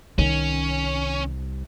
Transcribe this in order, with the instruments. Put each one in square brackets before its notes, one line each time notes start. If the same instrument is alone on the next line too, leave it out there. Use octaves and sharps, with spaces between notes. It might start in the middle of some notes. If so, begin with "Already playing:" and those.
[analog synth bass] C2 [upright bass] D#3 [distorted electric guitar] C#4